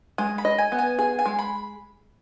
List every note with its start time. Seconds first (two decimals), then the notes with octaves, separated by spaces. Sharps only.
0.18 G#3 G#5
0.38 B5
0.45 D#5
0.58 G#5
0.72 B3
0.79 G#5
0.98 G#4 G#5
1.19 G#5
1.26 G#3
1.39 B5